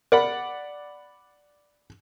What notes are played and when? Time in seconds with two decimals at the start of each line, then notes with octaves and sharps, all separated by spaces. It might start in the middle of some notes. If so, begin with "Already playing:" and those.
0.12 A#4 D5 F#5 B5